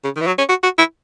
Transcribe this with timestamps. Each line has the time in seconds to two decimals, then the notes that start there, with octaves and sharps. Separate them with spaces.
0.04 C#3
0.16 D#3
0.21 E3
0.26 F#3
0.38 C#4
0.49 F#4
0.63 F#4
0.78 E4